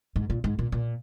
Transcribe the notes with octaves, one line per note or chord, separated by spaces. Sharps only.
G#2
A#2
G#2
A#2
A#2